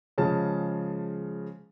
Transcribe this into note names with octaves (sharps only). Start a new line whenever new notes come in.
C#3 F3 G#3 A5